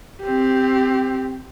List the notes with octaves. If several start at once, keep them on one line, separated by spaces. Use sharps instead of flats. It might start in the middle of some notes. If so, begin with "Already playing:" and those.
C4 G4